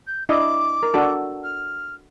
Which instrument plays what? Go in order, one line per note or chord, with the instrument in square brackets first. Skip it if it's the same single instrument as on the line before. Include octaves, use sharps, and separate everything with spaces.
[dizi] G6
[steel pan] D4 E4 D#5 [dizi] D6
[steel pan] A#4
D4 F#4 A4
[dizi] F6